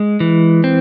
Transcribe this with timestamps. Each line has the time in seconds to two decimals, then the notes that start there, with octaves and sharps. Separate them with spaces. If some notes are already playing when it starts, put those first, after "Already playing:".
Already playing: G#3
0.20 E3
0.64 C4